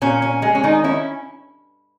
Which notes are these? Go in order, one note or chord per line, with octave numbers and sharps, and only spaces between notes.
A#2 C#4
C#4
G#3
C#4
D#3 D#4
C#4 E4